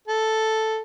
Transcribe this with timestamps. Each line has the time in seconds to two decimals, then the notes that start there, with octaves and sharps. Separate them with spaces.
0.08 A4